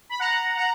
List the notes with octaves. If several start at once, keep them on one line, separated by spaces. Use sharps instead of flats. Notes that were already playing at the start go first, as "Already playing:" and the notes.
B5
F#5 A#5
F#5 A#5